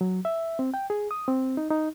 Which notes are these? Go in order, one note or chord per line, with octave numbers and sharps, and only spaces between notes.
F#3
E5
C4
G5
G#4
D#6
C4
D#4
D#4